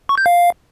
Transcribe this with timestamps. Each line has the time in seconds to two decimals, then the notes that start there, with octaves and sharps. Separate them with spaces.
0.09 C#6
0.18 G6
0.26 F5